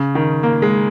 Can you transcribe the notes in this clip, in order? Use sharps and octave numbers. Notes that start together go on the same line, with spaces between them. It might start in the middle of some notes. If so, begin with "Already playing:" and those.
Already playing: C#3
D#3
A#3
G#3